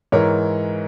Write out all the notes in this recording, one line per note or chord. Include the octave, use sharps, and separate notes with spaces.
G#2 E3 A#4 C#5